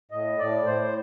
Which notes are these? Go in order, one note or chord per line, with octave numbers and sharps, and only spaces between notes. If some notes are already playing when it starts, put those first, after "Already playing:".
A2 D#5
A2 D5
A2 C5